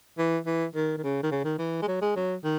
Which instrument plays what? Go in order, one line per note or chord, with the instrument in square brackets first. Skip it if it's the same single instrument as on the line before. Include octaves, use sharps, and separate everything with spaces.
[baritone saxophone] E3
E3
D#3
D#3
C#3
D#3
C#3
D#3
E3
G#3
F#3
G#3
F#3
D#3